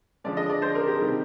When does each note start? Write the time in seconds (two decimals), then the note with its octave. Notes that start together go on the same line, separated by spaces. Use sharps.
0.24 D3 F3 G#3 D5
0.37 D#5
0.49 D5
0.62 C5
0.75 A#4
0.87 G4
0.99 C3 D#3 G3